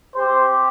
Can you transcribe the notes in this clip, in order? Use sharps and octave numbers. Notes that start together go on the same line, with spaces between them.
C4 G4 C5